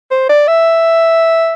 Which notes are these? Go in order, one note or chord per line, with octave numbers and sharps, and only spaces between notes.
C5
D5
E5